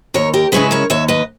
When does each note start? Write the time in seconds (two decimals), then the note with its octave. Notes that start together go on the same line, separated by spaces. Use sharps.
0.14 D#2 A#4 C#5
0.34 G4 A#4
0.52 C#3 G#3 C#4 E4 G#4 B4
0.71 A#4 C#5
0.90 D#2 C#5 E5
1.08 B4 D#5